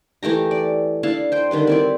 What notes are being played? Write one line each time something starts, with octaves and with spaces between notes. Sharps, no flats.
E3 A3 G4 A#5
D5
D4 E4 F5 A5
C5 G5
D3 D#3 G3 B4
C4 E4 D5